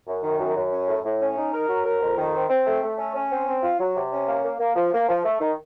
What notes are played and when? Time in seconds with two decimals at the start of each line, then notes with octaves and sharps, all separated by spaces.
0.07 F#2
0.23 D#3
0.40 F#2
0.56 F#2
0.72 C#4
0.88 A2
1.05 A2
1.21 C#4
1.37 D#4
1.53 A#4
1.69 F#3
1.85 A#4
2.02 F2
2.18 D#3
2.34 C4
2.49 C4
2.67 A3
2.83 A3
2.98 C#4
3.15 C#4
3.31 C4
3.47 C4
3.63 F4
3.80 F#3
3.96 C3
4.11 C#4
4.28 A#3
4.44 A#3
4.60 A#3
4.76 F3
4.93 A#3
5.09 F3
5.25 A3
5.41 D#3